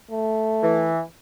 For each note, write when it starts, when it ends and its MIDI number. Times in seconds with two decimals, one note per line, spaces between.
0.11 0.92 57
0.63 1.01 52